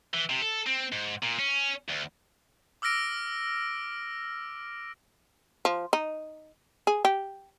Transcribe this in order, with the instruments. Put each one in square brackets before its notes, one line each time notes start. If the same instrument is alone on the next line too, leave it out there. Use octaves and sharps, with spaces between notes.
[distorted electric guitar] E3
C3
A4
C4
G#2
A#2
C#4
D2
[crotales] D6 E6 F6 A#6 D7
[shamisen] F3
D#4
G#4
G4